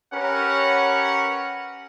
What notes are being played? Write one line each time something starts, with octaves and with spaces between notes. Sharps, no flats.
C#4 G4 A#4 B4 C#5 F#5